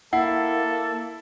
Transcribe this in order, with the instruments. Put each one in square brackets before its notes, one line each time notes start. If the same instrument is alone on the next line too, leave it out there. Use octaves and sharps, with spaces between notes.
[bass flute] A#3 [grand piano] E4 [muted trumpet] A4 [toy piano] F#5